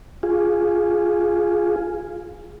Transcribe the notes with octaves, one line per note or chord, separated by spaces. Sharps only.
F4 G#4